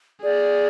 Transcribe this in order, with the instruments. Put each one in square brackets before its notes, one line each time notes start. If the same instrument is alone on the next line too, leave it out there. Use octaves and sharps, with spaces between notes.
[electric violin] G#4 [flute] D5